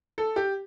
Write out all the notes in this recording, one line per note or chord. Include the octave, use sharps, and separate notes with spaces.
A4
G4